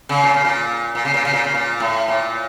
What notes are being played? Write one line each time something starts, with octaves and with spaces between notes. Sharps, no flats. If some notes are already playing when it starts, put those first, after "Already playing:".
C#3
A#2
C#3
A#2
A#2
C#3
A#2
C#3
A#2
C#3
A#2
A2
A#2